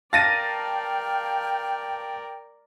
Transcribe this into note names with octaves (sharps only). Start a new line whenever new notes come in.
A#4 D5 F5 G5 A5 A6 A#6 D#7